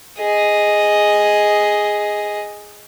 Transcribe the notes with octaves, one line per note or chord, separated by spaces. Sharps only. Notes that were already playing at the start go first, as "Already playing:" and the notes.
G#4 D#5